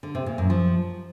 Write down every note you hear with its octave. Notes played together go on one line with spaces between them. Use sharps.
D3
C3
A#2
F#2
F3